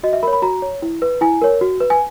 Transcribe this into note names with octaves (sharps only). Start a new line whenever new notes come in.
F#4 D#5
E5
A#4 C#5 B5
B5
F#4 A#5
C#5
E4
B4
E4 G#5
A#4 C#5
F#4
B4
G#5